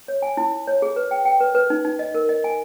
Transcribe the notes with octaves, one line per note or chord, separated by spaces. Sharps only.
C#5
G#5
E4
E4
C#5
G#4
B4
G5
G5
B4
B4
D#4
D#4
D#5
A#4
D#5
G#5